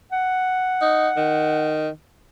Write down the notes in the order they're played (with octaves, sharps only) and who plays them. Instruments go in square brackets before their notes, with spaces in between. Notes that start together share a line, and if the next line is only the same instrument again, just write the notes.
[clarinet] F#5
[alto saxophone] D#4
D#3